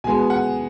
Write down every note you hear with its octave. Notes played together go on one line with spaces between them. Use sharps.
B2 G#3 B3 G#5
F#5